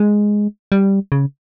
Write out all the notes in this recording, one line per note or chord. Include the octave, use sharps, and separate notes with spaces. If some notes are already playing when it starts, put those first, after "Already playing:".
Already playing: G#3
G3
C#3